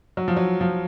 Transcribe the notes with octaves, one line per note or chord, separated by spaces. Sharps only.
F#3
F3
F#3
F3